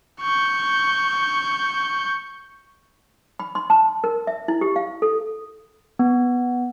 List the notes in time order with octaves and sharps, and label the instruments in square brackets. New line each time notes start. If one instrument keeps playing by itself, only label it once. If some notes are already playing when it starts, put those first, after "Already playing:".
[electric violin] C#6 G6
[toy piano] B5
C6
A5
A#4
E5
E4
G4
F5
A4
[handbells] B3